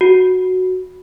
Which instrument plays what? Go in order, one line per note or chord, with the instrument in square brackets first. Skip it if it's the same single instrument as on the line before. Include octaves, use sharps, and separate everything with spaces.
[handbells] F#4